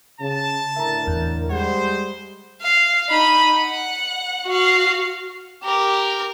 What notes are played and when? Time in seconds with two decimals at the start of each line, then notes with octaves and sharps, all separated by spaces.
0.20 C#3 A5
0.76 A2 D3 A#4 E5 A#5
1.07 E2
1.50 G3 G#3 C5 F#5
2.62 F5
3.09 D#4 B5
3.58 F#5
4.46 F#4 F5
5.63 G4 A#4